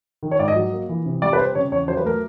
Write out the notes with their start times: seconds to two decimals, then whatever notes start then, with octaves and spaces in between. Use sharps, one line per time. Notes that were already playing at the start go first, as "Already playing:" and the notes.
0.23 D#3
0.31 C#5
0.39 G#2 D5
0.48 D#5
0.56 F#3
0.73 A#3
0.89 E3
1.06 C3
1.22 G3 D5
1.33 B4
1.39 C4 C5
1.55 C#3 C#5
1.72 E2 C#5
1.88 F#3 C5
1.97 B4
2.04 A3 A#4